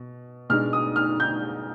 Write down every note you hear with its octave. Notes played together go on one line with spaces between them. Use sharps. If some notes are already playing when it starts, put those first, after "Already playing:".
Already playing: B2
B2 G#3 D4 F6
D#6
F6
G6